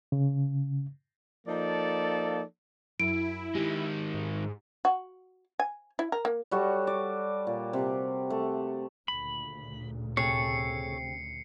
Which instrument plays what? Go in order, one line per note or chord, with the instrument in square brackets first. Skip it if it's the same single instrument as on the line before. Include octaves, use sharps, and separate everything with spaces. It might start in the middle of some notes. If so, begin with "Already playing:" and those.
[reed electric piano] C#3
[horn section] F3 A#3 D#4 A4 D5
[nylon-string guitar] F#2 [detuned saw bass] E4 [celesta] D7
[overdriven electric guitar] D#3 G#3 [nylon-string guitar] G4
[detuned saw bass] G#2
[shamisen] F#4
G#5
E4
A#4
A#3
[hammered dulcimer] G3 F#4 A4 C#5
D5
A#2
C3
A3
[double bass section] D2 A#2 C#3 [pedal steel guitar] B5
[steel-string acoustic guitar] C3 [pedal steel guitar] G#4 A4 C#5 [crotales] C7 C#7